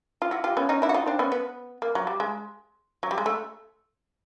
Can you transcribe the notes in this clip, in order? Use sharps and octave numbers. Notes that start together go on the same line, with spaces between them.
F4
E4 F#4
F4 G4
B3 C#4
C#4 D#4
D4 E4
F#4
D#4 F4
C4 D4
B3 C#4
B3
A#3
F#3
G3
G#3
F#3
G3
G#3
A3